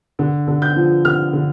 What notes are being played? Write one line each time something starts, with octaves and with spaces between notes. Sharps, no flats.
D3
D3
G6
F3
D3 F6
D3